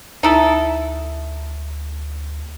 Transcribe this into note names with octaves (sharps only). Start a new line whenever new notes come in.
D2 D#4 E4 A4